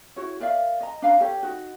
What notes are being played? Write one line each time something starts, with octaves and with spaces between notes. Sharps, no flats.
E4 F#4 C#5
A#4 D5 E5 F5
D#5 A#5
D4 F5 A#5
G4 A4 C#5
D#4 F#4